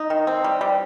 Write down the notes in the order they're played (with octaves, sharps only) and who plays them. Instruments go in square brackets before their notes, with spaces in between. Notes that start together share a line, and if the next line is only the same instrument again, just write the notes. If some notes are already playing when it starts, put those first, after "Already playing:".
Already playing: [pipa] D#4
D#3
C4
G3
G3